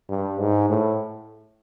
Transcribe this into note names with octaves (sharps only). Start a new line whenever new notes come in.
G2
G#2
A2